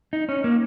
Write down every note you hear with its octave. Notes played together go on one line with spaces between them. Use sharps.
D#4
C#4
A#3